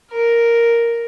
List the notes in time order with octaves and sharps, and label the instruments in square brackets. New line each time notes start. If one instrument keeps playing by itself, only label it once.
[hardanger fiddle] A#4